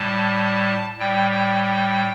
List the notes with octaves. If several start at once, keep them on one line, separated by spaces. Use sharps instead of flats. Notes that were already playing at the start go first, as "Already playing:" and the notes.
Already playing: A2 G3 A5
A2 G3 G5
G5
G5